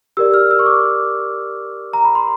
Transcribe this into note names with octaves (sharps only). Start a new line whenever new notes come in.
G4 A#4 D5 E6
F6
E6
C#6
D6
A#5
B5
C6